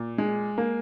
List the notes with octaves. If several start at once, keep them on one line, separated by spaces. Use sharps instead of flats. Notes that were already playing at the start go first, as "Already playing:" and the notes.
Already playing: A#2
G#3
A#3